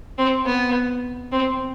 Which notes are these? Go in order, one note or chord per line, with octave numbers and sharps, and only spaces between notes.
C4
B3
C4